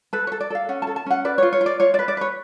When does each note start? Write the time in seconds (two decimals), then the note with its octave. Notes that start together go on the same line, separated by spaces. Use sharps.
0.13 A4 B4
0.27 C#5
0.32 A4
0.40 D5
0.50 A4 F5
0.69 C#4 F#5
0.82 A5
0.87 A4
0.96 A5
1.06 C#4 F#5
1.25 B4 D5
1.38 F4 C#5
1.53 C#5
1.61 F4
1.66 D5
1.80 F4 C#5
1.94 D5
1.99 B4
2.08 D5
2.17 B4 C#5